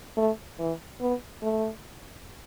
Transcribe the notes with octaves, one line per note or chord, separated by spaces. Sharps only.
A3
E3
B3
A3